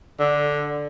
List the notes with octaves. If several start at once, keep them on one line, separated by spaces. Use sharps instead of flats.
D3